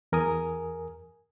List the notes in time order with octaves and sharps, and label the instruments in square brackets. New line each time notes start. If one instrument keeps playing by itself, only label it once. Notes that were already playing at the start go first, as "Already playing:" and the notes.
[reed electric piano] E2 A#4 G#5 D#6